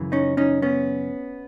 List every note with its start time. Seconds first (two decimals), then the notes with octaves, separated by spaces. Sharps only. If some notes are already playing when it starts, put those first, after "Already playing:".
Already playing: F#2 C#3 E3
0.12 C#4 D#4
0.37 C#4 D#4
0.62 B3 C#4